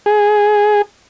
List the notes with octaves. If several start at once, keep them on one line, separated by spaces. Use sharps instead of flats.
G#4